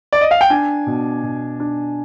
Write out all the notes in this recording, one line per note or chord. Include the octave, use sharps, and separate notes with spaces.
D5
D#5
F5
G5
D4 G#5
B2
B2
D4